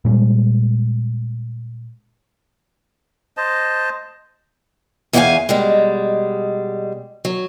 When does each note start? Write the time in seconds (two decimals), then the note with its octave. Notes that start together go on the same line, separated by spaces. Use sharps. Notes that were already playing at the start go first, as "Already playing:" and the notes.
0.05 A#2 G3 G#3
3.37 C5 D#5 A5
5.13 E2 C#3 G4 C5 F5 G#5
5.49 B2 G3 G#3
7.25 F#3